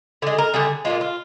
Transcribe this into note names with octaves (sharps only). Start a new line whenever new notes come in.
D3 G#3 G#4
A#4
D3 G3 G#4
A#2 F3 G#3 F4
F4